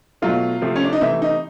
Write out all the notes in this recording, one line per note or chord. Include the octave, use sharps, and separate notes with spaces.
B2 F#3 A3 F4
C3 F3 A3
C#4
D4
D#4
C3 E3 A3 E4
D#4